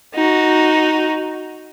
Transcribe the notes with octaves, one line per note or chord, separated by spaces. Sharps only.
D#4 F#4